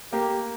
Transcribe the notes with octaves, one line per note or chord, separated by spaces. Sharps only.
A#3 G4